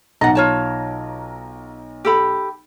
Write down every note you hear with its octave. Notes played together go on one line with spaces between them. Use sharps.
B1 D#5 F#5 A#5 A6
F4 C#5 A5
G4 A4 B5